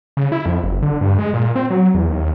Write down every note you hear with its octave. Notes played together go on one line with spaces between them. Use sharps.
C#3
E4
F2
F#1
D3
G2
G#3
A#2
C4
F#3
E2
D#2